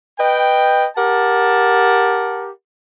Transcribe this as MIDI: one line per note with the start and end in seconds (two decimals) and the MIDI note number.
0.19 0.86 71
0.19 0.86 75
0.19 0.86 79
0.97 2.48 67
0.97 2.48 70
0.97 2.48 78
0.97 2.48 81